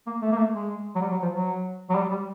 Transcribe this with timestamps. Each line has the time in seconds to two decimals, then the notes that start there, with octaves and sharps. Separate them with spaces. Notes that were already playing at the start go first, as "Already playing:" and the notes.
0.06 A#3
0.22 A3
0.32 A#3
0.37 A3
0.54 G#3
0.95 F#3
1.01 G3
1.11 F#3
1.22 F3
1.33 F#3
1.89 F#3
1.95 G3
2.11 G3